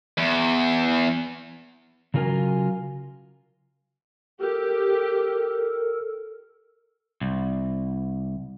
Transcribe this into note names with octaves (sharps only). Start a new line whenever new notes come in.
E2
C#3 F#3 F4 A#4 G#5
G4 A4 A#4
C2